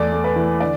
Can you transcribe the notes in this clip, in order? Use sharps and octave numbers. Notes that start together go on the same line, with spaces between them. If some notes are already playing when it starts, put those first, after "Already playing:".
Already playing: E2 A3 D5
A3
B4
E3
D3 D5